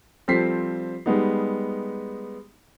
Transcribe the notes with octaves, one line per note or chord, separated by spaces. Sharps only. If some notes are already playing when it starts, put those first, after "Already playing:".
F3 G3 C4 A4 B6 C7
G3 G#3 B3 D#4